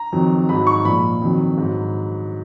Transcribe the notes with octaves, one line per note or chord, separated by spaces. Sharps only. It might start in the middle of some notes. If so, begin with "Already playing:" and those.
Already playing: A#5
F2 D#3 F#3
G#2 F#3 B5
C#6
A#2 F3 B5
F2 D#3 F#3
G#2 F#3